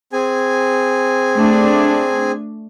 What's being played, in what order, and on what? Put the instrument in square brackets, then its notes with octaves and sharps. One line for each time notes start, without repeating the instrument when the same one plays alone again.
[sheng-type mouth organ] C4 G#4 G#5
[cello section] A3 D4